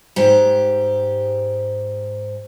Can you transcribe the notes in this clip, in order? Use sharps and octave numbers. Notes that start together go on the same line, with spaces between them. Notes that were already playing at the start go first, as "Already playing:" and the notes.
G#2 G4